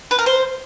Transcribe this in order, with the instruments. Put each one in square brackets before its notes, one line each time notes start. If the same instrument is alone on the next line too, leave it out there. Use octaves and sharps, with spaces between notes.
[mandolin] B4
A#4
C5